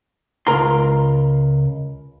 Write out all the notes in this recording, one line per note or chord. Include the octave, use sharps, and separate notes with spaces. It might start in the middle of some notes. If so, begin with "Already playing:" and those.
C#2 A#4 A#5 C6